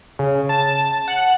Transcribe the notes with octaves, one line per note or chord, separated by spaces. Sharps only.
C#3
A5
F#5